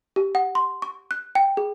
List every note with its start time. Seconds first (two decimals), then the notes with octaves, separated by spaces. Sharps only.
0.16 G4
0.35 F#5
0.55 C6
0.82 C#6
1.11 F#6
1.35 G5
1.57 G#4